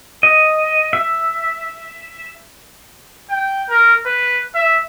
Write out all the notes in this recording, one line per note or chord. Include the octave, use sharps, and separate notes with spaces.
D#5
E5
G5
A#4
B4
E5